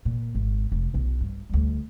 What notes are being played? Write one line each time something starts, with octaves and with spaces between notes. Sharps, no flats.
A#2
G#1
F1
B1 E4
G2
D2 G3